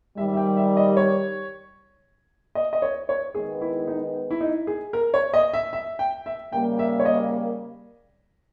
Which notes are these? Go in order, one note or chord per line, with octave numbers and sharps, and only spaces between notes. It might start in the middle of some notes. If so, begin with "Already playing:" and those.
G#2 D#3 G3 E5
E5
G5
E5
D#5
C#5
D#5
D#5
C#5
C#5
D#3 G#3 B3 G#4
E4
D#4
E4
D#4
G#4
A#4
C#5
D#5
E5
E5
G5
E5
C#3 G3 A#3 G5
E5
C#5
D#5